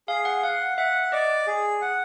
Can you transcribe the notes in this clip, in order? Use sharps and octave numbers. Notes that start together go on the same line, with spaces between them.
G#4 F5
F#5
F5 F#5
E5 F#5
D5 D#5
G#4
F#5